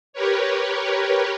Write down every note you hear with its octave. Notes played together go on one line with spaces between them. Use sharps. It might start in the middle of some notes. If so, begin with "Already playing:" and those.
G4 A#4 B4 C#5